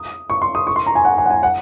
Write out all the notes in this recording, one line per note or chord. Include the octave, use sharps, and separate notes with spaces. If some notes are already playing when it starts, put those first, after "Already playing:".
Already playing: D#6
C#6
C6
D#6
C#6
C6
A#5
G#5
F#5
G#5
F#5
G#5
F#5